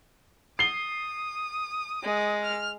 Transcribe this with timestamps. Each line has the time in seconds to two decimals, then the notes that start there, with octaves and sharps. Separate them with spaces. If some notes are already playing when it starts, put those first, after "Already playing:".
0.59 D#6 C7 G7
2.03 G#3
2.43 F6